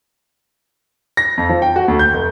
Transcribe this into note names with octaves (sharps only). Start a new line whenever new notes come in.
A#6
F2
F3
G5
F#4
D2
G6
F1